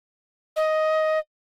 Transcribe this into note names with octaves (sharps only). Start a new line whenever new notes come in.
D#5